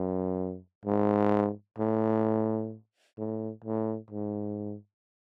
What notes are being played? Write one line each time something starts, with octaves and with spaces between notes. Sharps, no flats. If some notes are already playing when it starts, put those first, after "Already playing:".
Already playing: F#2
G#2
A2
A2
A2
G#2